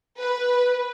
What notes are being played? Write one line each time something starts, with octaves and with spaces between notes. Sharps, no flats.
B4